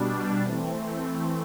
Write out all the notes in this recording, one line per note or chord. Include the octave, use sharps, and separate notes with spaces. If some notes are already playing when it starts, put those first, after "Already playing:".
Already playing: B2 G3 D4
E3 A3 C4